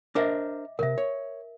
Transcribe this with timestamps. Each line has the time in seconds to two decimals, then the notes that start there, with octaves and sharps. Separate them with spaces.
0.15 D4 A#4 C5 D#5 E5 D6
0.79 B1 C3 A#4 E5
0.98 C#5